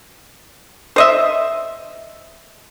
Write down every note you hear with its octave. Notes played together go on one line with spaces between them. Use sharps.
C5 D#5 E5